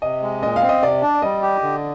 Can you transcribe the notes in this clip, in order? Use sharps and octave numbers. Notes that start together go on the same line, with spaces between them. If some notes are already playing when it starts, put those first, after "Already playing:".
C3 D#5
G#3
A#2 D#5
F5
C4
D#5
C3 D5
D4
G3 D#5
G4
D3